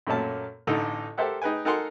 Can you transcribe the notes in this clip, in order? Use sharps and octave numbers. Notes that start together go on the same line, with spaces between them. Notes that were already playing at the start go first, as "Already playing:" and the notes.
F#2 A#2 A3 A#3 C#4 A5
A1 D3 D#4 A4 D6
G4 A4 A#4 C5 E5 F#5
D#4 G#4 B4 G5 G#5
D#4 A4 A#4 F#5 G#5 C6